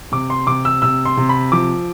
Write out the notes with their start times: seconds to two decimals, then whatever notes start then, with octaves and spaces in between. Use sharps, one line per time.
0.12 C3 D6
0.30 C6
0.47 C3 D6
0.65 E6
0.82 C3 E6
1.05 C6
1.17 C3
1.29 B5
1.52 F3 D6